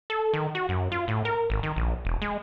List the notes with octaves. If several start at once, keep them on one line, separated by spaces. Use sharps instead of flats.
A4
D#3
F#4
F#2
F4
A2
A#4
G#1
D#3
A#1
E1
G#3